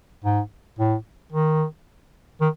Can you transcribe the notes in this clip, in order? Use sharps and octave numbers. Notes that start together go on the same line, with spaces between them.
G#2
A2
D#3
D#3